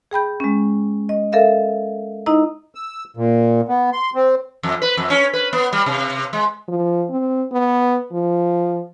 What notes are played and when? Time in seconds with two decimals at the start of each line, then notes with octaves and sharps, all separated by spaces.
0.11 G#4 G5 B5 G6
0.40 G#3 C#4
1.09 D#5
1.32 A4 A#4 E5 F5
2.26 D#4 E4 D#5 A#5
2.75 E6
3.17 A#2
3.69 B3
3.93 C6
4.15 C4
4.63 F2
4.82 B4
4.97 F2
5.10 C#4
5.33 B4
5.53 B3
5.73 G3
5.86 C3
6.33 G#3
6.69 F3
7.10 C4
7.52 B3
8.12 F3